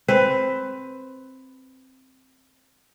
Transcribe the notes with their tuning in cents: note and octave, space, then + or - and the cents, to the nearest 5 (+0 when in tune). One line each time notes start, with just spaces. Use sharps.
C4 +5 B4 +15